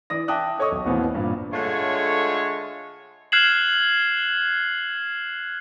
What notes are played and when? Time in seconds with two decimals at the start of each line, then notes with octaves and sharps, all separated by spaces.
0.10 E3 D5 D#6 A#6
0.28 E5 G5 A5 D6 D#6 F#6
0.59 A4 C#5 D#5 C#6 D#6
0.72 B1
0.85 A1 D#2 B2 E3 B3 C4
1.14 G2 A#2
1.53 D3 G#3 A3 F4 C#5
3.32 F6 F#6 G#6 C7 E7 F#7